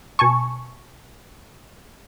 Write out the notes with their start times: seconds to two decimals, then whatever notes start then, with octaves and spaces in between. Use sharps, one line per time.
0.19 B2 G#5 A5 C#6